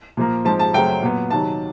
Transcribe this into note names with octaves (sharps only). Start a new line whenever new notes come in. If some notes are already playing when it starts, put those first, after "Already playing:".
A#2 F3 A#3
G#2 F3 G#3 C4 A5
A5
F#2 C#3 F#3 A3 C4 G5
A#2 F#3 B3
C3 D#3 F#3 A5